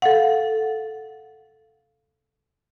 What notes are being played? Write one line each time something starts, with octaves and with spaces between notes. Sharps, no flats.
A4 F5 F#5